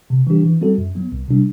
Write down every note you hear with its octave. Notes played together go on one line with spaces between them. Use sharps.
C3
E3 G3 D4 G4
E3
G3 C4 F#4 A4
F#2
F#3 B3
C2
C3 G3 D4